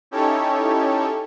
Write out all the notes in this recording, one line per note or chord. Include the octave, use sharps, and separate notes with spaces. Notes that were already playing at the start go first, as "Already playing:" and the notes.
C#4 D#4 E4 G4 A4 C#5